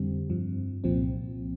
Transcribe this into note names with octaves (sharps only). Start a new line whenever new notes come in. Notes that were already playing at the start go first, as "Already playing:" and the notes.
Already playing: F2 D3 G3 C4
G2 F3
C2 A#2 F3 C4